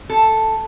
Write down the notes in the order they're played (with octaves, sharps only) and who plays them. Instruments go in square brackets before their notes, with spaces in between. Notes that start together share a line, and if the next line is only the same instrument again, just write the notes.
[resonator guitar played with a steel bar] A4